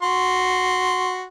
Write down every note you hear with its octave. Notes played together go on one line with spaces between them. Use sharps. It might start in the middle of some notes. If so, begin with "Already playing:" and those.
F#4 C6